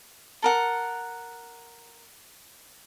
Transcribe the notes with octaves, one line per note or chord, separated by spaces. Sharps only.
A4 A#4 F#5